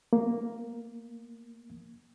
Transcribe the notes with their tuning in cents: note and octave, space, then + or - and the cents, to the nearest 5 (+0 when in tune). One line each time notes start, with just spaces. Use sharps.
A#3 +0